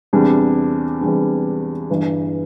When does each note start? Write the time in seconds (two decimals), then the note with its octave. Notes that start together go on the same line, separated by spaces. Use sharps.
0.13 E2 C3 G3 D4
1.01 E2 C3 G3 D4
1.90 G1 G2 E3